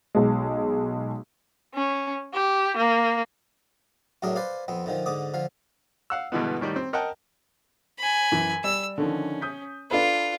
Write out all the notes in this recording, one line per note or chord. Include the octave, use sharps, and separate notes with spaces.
B1 G#3
C#4
G4
A#3
F#2 A2 F#3 D4 G#4 A#4
B4 C5 D5 F5 G#5
F2 B3 C4
D3 D#3 F3
G#2 D3 D6 D#6
D3 F3 F5
F5 F#5 E6
G2 B2 D3 E3 G#3 B3
A2 D#3 G3
C4
A#4 D#5 F#5 G5 A5
G#5 B5
F#2 E3
G3 E6
D3 D#3 F3 C#4
D#6 G6 B6
D4 F4 A4 B4